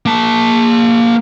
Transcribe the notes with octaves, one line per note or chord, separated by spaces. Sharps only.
A#3 A5